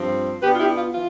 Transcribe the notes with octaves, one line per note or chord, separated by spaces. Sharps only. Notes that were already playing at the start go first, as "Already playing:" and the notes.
Already playing: G2 F3 C4
B2 B3 D4 G4 B4
F4
E4 G4
F4
E3 F4